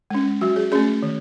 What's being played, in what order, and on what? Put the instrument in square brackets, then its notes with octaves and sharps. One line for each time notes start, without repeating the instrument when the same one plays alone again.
[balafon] G#3 C#4
F#3 F#4
G#4
A3 C#4 G#4
D#3